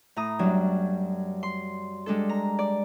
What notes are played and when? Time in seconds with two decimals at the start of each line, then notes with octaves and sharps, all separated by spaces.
0.16 A2 A#5 D#6
0.39 F#2 F#3 G3 D4
1.43 C6
2.06 G3 G#3 D4 A4
2.29 A#5
2.59 D5